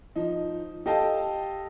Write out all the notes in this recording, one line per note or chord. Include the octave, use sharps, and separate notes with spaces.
F3 D#4
G4 A4 D#5 F5 G5 A5